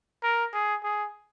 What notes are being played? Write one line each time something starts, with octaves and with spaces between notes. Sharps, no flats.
A#4
G#4
G#4